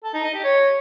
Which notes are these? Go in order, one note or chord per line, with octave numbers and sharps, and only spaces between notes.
A4
D#4
D#5
G4
C#5